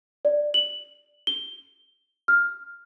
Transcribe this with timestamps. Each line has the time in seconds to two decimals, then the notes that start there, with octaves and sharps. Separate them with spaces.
0.25 D5
0.54 F#7
1.27 G7
2.28 F6